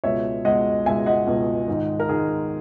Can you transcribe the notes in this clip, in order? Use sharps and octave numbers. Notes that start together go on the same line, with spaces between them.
C#2 B2 G#3 C#5 E5
C#2 B2 G#3 D#5 F#5
C#2 B2 G#3 E5 G#5
D#5 F#5
C#2 B2 G#3
G#2 D#3 G#3
A#4
G#2 D#3 G#3 G#4